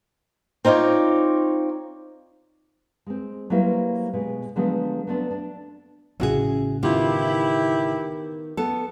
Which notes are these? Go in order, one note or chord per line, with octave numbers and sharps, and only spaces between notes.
C4 D#4 F4 C#5 D5
G#3 C4
F#3 G3 A#3 E4 B4 C5
B2 G#3
D3 F3 F#3 G#3 A3 B3
F#3 A3 B3 C4 D4
D4
A1 C#3 E4 F#4 G#4
D#3 B3 E4 F4 G4
B3 A4